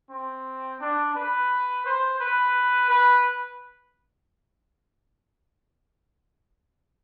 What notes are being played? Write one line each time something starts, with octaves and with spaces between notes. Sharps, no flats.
C4
D4
B4
C5
B4
B4